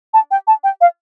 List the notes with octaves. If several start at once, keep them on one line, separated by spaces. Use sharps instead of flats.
A5
G5
A5
G5
F5